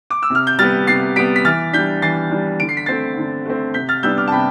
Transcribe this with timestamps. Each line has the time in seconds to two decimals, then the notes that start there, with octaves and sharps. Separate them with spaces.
0.10 D6
0.22 E6
0.30 C3 F6
0.47 G6
0.59 G3 B3 F6 A6
0.87 C3 A6 C7
1.16 G3 B3 B6 D7
1.36 B6
1.45 E3 F6 A6
1.73 G3 D4 G6 B6
2.02 E3 A6 C7
2.31 G3 D4
2.60 D3 D7
2.69 C7
2.77 B6
2.86 A3 C4 A6 C7
3.17 D3
3.45 A3 C4
3.74 C3 G6 B6
3.89 F6 A6
4.03 G3 B3 D4 E6 G6
4.18 D6 F6
4.28 A5
4.32 C3 G5 B5